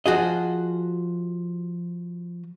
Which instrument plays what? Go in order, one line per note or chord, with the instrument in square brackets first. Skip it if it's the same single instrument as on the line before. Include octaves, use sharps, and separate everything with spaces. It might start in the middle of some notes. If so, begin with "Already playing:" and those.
[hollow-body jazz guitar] F3 F#4 G#4 D#5